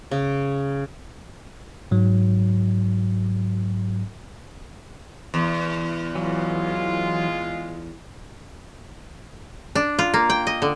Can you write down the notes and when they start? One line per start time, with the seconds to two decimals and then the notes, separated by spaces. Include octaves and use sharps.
0.11 C#3
1.91 G#2 F#3
5.34 E2
6.15 E3 F#3 G#3 F4
9.75 D4
9.99 F4
10.14 A#3
10.30 G5
10.47 D#5
10.62 D3